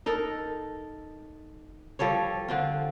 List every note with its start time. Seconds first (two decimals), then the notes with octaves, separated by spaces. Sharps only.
0.06 D#4 A4 A#4
1.99 F3 G3 A4 C#5
2.48 D3 C4 F4